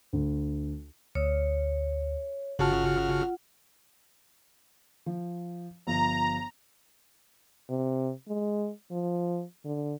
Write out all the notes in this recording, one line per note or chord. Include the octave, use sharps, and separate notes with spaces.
D2
D2 C#5
G1 C#3 F4 F#4 F#5 A5 F6
F3
G1 F3 A#5
C3
G#3
F3
D3